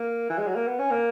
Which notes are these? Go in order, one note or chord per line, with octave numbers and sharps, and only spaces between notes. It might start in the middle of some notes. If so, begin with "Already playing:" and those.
Already playing: A#3
E3
G#3
F#3
A#3
B3
C#4
A#3